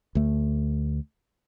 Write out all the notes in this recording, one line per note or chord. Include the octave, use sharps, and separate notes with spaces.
D2 A3